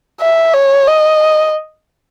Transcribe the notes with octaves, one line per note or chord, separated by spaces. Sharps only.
E5
C#5
D#5